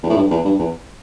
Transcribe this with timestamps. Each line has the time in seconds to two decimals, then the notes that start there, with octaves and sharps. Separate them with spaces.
0.03 E2
0.10 A2
0.17 G2
0.31 E2
0.45 G2
0.59 E2